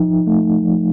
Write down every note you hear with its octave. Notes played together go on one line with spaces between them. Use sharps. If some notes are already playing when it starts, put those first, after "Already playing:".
Already playing: F3 D#4
A3
F3